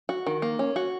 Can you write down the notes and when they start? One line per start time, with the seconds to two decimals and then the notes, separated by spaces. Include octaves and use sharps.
0.09 F#4
0.27 D#3
0.42 A#3
0.59 C#4
0.76 F#4